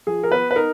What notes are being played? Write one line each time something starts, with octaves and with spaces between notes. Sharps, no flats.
F3 G#4
A#4
B3 B4
B4
D#4 A#4